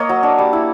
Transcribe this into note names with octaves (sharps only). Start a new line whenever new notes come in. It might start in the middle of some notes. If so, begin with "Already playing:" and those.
Already playing: A#3 C#5 D#5
F#3
D4
G3
E4